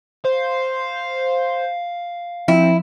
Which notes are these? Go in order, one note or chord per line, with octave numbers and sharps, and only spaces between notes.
C5 F5
F3 C4 E4